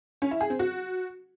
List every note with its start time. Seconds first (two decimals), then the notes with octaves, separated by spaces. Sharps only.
0.22 C#4
0.31 E4
0.41 G#4
0.50 C4
0.59 F#4